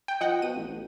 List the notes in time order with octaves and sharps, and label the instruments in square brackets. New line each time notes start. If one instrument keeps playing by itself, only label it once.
[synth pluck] G5
[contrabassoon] F3 [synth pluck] D#5 F#5 G5
[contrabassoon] B2 [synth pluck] D#7
[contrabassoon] A1
A1